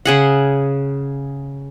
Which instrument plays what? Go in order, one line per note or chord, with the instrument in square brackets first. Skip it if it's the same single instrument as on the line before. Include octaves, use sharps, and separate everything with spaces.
[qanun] C#3 G#4 F#5